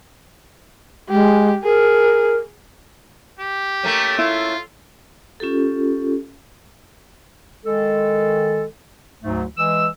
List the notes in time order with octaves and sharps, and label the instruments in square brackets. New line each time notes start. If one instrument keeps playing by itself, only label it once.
[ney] G#3 [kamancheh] G4
[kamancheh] G#4 [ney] A#4
[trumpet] G4
[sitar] A3 A#3 C#4
[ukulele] E4 [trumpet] F4
[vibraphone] C#4 F4 G4 A4
[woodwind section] D#3 G#3 A4
D2 G#2 F#3 A3
E3 G#3 E6